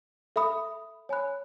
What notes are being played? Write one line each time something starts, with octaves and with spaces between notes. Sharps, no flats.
A4 E5 B5 D#6
C#5 G#5 B5 F#6